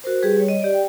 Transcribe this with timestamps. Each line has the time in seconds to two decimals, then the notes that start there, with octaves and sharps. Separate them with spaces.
0.04 F#4 A#4 C5
0.22 G3 G4 G#4 B4
0.37 G3 C#5
0.48 D#5
0.62 G4 D5
0.74 G5